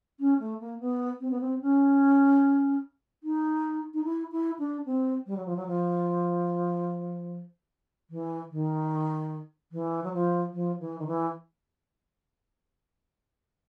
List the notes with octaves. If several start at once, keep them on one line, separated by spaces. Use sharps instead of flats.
C#4
A3
A#3
B3
C4
B3
C4
C#4
D#4
D#4
E4
E4
D4
C4
G3
F#3
F3
F#3
F3
E3
D#3
E3
F#3
F3
F3
E3
D#3
E3